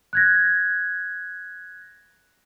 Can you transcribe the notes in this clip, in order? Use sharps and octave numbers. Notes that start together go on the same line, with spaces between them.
F#6 G#6 A#6